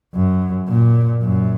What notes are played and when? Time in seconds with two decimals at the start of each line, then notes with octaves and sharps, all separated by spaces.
0.14 F#2
0.68 A#2
1.23 F#2